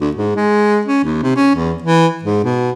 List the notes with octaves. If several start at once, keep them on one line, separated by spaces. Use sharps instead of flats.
D2
G#2
G#3
C#4
D#2
C3
C#4
E2
E3
G#2
B2